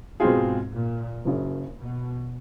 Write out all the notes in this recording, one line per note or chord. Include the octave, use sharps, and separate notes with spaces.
G#2 B2 G#3 C4 F4 G#4
A#2
F#1 F#2 C#3
B2